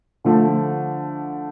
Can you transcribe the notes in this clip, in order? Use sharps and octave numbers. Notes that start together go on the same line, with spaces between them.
D3 F3 A3